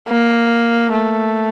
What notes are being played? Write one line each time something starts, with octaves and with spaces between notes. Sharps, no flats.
A#3
A3